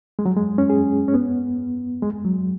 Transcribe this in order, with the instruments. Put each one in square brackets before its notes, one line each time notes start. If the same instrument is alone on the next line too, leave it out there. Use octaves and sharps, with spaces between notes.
[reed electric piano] G#3
F#3
G#3
C#4
G#4
C#4
B3
G#3
F#3